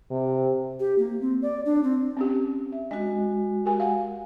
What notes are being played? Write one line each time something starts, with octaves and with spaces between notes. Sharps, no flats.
C3
G4
A#3
C4
D5
D4
C4
C4 C#4 G4
E5
G#3 D4 F#4 D#5
G4 A#4 G#5
F5 F#5